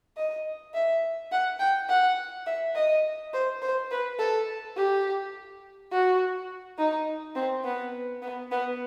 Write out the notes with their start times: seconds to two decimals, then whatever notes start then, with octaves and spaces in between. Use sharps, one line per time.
0.17 D#5
0.73 E5
1.31 F#5
1.59 G5
1.88 F#5
2.46 E5
2.75 D#5
3.33 C5
3.62 C5
3.91 B4
4.18 A4
4.76 G4
5.91 F#4
6.78 D#4
7.35 C4
7.64 B3
8.22 B3
8.51 B3